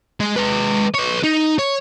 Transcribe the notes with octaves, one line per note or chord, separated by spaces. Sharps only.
G#3
G#3 B4
B4 C#5
D#4
C#5